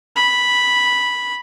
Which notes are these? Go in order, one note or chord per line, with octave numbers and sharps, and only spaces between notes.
B5